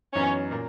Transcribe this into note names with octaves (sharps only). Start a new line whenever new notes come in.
F#2 E3 B3 C#4 D#4 F#4
A#2 A#3